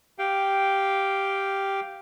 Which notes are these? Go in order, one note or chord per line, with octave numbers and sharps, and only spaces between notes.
G4 F5 G5